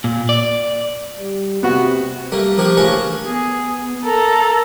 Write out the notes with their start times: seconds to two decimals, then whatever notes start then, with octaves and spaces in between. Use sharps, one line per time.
0.04 A#2
0.29 D5
1.19 G3
1.63 C3 B3 F#4
2.32 G3 A3 A#3
2.57 F3 A#3 D4 G4 C#6
2.77 A1 C#3 C#4 D4 A#4 C#6
3.25 B3 G#4
4.04 A4 A#4 A#5